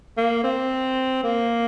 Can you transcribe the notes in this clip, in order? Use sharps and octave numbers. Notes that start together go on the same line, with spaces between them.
A#3
C4
A#3